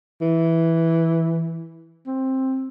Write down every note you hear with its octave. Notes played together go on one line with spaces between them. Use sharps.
E3
C4